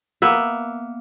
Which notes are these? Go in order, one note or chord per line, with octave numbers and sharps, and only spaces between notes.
A#3 B3 E5